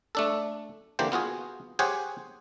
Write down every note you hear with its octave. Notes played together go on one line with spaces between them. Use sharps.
A3 D4 A4
D3 E3 A#3 G4 C5
B3 F4 F#4 G#4
G4 G#4 C5 C#5 F#5 G#5